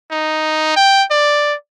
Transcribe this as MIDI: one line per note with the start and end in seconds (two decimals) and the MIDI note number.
0.11 0.73 63
0.76 1.03 79
1.11 1.54 74